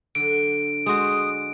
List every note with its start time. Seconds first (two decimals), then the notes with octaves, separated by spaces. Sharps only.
0.15 D3 F#3 D7
0.86 G#3 F#4 C5 D#6